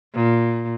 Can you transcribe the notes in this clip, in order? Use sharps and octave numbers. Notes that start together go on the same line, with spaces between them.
A#2